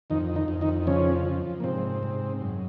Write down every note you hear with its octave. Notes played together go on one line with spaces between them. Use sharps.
F2 D#3 D#4
D#3 D#4
F2
D#3 D#4
C#3 F3 C#4
F3
A#3
G#2 C3 C4
G#2
F#2